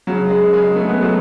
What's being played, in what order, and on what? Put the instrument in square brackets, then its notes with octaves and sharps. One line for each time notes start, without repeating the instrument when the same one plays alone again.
[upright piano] C#3 F#3
G#3
C#3 G#3
A3
B3
F#3 A3